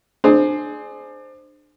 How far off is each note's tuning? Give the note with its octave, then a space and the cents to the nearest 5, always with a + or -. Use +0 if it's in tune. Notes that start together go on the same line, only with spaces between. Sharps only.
D4 +30 G#4 +20 C5 +0